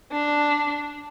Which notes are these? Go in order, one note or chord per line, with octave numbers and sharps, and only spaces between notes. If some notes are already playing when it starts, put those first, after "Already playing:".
D4